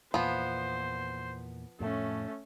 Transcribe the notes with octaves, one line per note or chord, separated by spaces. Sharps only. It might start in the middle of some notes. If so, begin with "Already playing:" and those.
E2 A#2 F3 B3 C5
F2 A2 A3 C#4